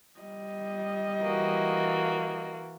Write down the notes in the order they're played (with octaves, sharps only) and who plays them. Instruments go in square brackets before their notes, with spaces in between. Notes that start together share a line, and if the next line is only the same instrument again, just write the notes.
[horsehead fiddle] G3 D#5
[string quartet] E3 A#3 F#4